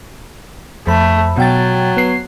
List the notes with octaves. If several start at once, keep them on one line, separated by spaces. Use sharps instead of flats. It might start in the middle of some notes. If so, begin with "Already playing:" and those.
F2 A3 B5
B2 F#3 G5 A6
B3 C7